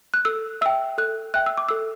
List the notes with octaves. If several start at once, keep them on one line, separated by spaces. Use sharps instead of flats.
F#6
A4 E6
E5 G5 E6
A4 F#6
E5 G5 F#6
E6
D6
A4 E6